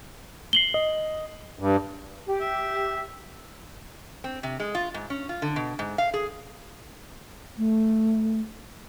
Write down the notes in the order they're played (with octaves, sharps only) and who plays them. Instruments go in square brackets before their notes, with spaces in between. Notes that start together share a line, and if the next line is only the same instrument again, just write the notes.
[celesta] C7 F#7 G7
[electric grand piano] D#5
[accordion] G2
[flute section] G4
[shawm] E5
[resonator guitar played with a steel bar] C4
C3
G#3
F4
G#2
C#4
F4
D3
B2
G#2
F5
G#4
[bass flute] A3